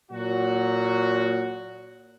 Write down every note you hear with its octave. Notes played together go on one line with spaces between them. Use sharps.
A#2 F#3 F#4